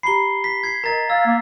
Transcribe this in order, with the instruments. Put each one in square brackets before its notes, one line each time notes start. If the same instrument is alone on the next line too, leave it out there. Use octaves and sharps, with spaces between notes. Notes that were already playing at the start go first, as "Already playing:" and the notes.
[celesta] G4 A#5 B5 [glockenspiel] C7 G7
[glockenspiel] B6
G#6 C7
[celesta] A#4 D#5 [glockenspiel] A#5 A6
[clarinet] F5 [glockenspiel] E6 [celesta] G#6 A6
[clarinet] A#3